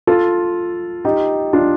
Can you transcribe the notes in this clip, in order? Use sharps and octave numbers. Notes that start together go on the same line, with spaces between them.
F4 A4
D#4 G4
D4 F4